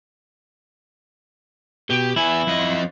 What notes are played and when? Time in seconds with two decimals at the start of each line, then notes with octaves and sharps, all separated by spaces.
1.90 B2 G4
2.16 E2 E4 G#5
2.47 F2 D#5